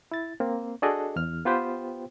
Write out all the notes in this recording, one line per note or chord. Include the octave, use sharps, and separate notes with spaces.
E4 A6
A#3 C4
D4 F#4 G#4 A4 D5 D#5
E2 F6
B3 F4 G4 B4 C5 G5